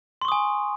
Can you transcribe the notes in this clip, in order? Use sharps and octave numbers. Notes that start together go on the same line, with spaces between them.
G#5 C6 C#6 D#6